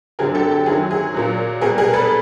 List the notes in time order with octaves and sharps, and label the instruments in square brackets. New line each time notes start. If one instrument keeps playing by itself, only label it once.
[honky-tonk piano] F#2 D3 F#3 G#4 A#4
G4 A4
G4
F#2 D#3 F#3 G#4
G#4
A#2 F#3
B2 G#4 A#4
G3
G#4 A#4
A4 B4